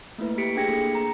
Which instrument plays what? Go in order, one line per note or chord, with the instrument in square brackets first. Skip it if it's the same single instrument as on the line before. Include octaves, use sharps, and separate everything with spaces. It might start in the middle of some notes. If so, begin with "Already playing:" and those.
[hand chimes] A3 A#3 E4 B4
A3 G4 B6 C#7 D7
D4 G#4 G5 G#6 A#6 C#7
A#3 G#4 A4
A#5